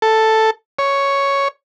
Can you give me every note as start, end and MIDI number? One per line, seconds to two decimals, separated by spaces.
0.02 0.50 69
0.79 1.48 73